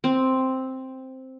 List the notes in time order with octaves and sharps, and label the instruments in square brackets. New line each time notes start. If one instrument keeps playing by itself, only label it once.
[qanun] C4